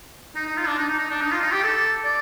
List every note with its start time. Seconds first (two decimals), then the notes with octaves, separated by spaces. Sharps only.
0.36 D#4
0.47 D#4
0.57 F4
0.67 D4
0.78 D#4
0.89 D#4
0.99 D#4
1.10 D4
1.21 D#4
1.31 F4
1.42 D#4
1.52 G4
1.63 A4
2.05 D5